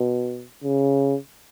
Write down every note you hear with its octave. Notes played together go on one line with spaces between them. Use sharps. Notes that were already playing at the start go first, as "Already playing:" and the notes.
Already playing: B2
C#3